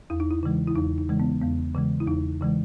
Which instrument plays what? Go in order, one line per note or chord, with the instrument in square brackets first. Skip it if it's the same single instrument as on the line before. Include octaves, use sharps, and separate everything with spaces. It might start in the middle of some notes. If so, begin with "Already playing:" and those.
[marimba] E2 E4
D#4
E4
C#3 E3 G#3
E4
E2 D#4
D#4
C#3 E3 G#3
B3
E2 B3
C#3 E3 G#3
E4
E2 D#4
C#3 E3 G#3